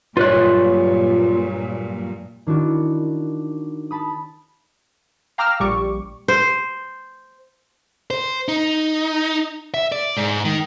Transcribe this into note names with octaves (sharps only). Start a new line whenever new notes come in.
G2 A#2 F#3 F4 B4 C#5 D5 F#6
D#3 D4 E4 F#4 D5
A5 B5 D#6
F5 G5 A#5 D6 E6 F6
A#1 G3 C#6 D6
C5
C5
D#4
E5
D5
G#2
D#3